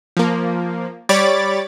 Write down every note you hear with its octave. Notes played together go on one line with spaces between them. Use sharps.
F3 A#3
G3 C#5 D5 B5 D6 A6